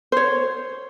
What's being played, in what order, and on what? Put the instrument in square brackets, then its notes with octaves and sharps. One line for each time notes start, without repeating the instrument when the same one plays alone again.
[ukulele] C5 C#5